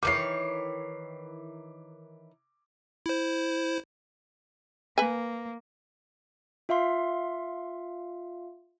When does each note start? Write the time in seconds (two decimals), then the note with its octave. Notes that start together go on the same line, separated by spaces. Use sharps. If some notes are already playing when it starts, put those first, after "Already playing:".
0.03 D#3 E3 C#5 D6 C7
3.06 E4 C5
4.98 A#3 B4 G#5
6.69 F4 E5 F5 C6